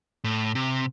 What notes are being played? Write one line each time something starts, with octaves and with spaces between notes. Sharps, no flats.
A2
C3